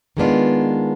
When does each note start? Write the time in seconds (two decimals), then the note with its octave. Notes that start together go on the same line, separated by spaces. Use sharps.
0.17 D#3 G#3 B3 D4 F4